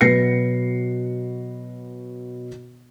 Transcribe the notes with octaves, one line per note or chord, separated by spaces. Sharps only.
B2 F#3 B4 A#6 C7 C#7